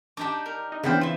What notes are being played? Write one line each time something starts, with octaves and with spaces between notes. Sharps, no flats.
D4 D#4 G4 A5 D6
A#4
D#4
C#3 E3 B3 C4 D4 F5 G5
F4 E5